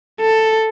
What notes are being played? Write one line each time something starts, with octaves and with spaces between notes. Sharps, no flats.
A4